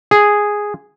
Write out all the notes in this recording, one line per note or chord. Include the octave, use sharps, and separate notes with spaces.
G#4